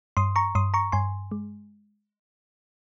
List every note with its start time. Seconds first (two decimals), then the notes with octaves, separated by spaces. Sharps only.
0.17 G2 C6 D#6
0.36 A#5 C#6
0.55 G2 C6 D#6
0.74 A#5 C#6
0.92 G2 G#5 C6
1.32 G#3